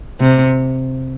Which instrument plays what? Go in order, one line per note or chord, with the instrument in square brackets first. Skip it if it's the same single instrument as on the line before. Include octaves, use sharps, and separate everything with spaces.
[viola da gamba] C3